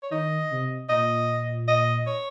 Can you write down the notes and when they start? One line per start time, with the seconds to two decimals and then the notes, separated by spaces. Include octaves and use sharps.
0.03 C#5
0.10 D#3 D#5
0.51 C3
0.89 A#2 D#5
1.68 D#5
2.07 C#5